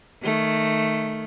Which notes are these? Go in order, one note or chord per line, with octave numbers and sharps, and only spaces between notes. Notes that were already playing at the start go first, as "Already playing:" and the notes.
D#3 A3